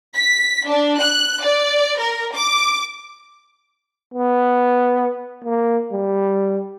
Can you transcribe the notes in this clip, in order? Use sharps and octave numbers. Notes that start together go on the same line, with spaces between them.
B6
D4
F#6
D5
A#4
D6
B3
A#3
G3